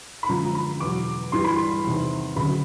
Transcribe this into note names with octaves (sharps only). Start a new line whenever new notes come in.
B5
F#2 D3 F3 G#3 A#5
A#5
B5
E2 B2 F#3 D6
G2 E3 G3 C6
B5
C6
E2 C3 D#3
D2 C#3 F#3 B5